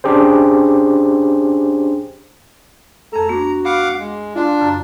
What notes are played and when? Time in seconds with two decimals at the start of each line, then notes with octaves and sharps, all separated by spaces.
0.04 C#4 D4 G4 G#4 C5
3.13 F2 A3 A4 A#5
3.29 B3 D4 F#4
3.65 F5 F#5 B5 D6
3.99 G#3
4.35 D4 F4
4.60 F#2 C#3 A5